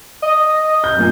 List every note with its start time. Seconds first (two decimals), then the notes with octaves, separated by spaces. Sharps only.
0.22 D#5
0.84 G6
0.96 F#2 A#2